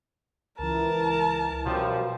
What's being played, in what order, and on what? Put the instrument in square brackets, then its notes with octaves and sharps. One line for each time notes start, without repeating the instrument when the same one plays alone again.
[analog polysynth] C#2 E3 [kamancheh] A#4 [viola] A5
[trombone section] F#2 F3 G3 [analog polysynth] B2